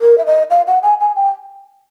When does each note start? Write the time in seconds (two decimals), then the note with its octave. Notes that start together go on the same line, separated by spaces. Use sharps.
0.01 A#4
0.18 E5
0.26 D#5
0.50 F5
0.67 F#5
0.83 G#5
1.00 G#5
1.16 G5